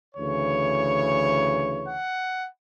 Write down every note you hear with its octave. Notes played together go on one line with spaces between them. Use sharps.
D2 C#3 E3 C#5
F#5